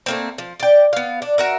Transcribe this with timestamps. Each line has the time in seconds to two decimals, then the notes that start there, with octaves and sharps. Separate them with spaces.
0.06 A3 A#3 C4
0.38 F3
0.60 D5 G5
0.93 B3 F5
1.22 D4
1.38 F#4 A#4 E5